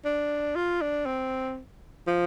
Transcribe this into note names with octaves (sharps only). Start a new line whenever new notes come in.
D4
F4
D4
C4
F3